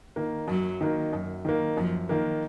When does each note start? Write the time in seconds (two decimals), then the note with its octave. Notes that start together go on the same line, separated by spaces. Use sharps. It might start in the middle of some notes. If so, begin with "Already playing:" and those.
0.16 D#3 A#3
0.48 F#2 F#3
0.81 D#3 A#3
1.13 F#2
1.45 D#3 A#3
1.77 F#2 F3
2.09 D#3 A#3